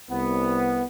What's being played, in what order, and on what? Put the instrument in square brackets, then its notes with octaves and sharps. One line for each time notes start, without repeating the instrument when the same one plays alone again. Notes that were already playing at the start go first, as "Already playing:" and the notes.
[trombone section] C2 B3